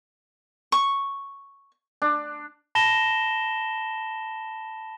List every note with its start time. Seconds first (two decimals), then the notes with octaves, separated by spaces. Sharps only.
0.72 C#6
2.02 D4
2.75 A5 B5 A#6 E7 G7